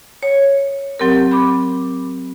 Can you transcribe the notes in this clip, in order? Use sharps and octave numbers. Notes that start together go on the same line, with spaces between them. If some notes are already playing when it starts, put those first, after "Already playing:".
C#5
F#3 C4 G4 A#4
B5 D6